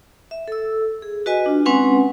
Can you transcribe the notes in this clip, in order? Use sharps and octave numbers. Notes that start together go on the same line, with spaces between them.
E5
A4 E6
G#4
F#4 B4 D#5 G#5
D4 F4
G#3 C4 C#4 B4 F#5 G#5